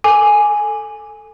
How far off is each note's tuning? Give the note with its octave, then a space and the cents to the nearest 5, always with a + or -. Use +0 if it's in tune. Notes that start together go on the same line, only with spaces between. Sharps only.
A4 +5 G#5 +0 D6 +0